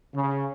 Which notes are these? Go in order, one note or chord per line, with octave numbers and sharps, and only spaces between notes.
C#3